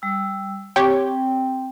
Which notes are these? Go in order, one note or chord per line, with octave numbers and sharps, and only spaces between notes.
G3 E6
C4 G4 C#5 G5